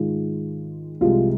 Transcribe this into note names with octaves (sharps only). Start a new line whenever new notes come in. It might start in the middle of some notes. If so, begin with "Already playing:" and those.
Already playing: G#2 D#3 G#3 F4
C2 C3 F3 G#3 F4